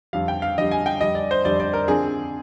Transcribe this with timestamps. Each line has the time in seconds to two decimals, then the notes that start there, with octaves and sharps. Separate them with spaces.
0.13 F2 D3 G3 F5
0.28 G5
0.42 F5
0.58 F2 D3 G3 D#5
0.71 G#5
0.86 G5
1.01 F2 D3 G3 D#5
1.15 D5
1.31 C5
1.45 F2 D3 G3 D5
1.60 D5
1.73 A#4
1.88 D3 F3 C4 G#4